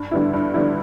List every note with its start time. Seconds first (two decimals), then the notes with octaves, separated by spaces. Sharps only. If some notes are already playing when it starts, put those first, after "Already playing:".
Already playing: G2
0.11 D3 G3 B3 E4
0.33 G2
0.54 D3 G3 B3 E4